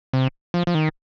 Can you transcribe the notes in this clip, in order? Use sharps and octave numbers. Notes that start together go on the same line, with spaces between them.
C3
F3
F3
D#3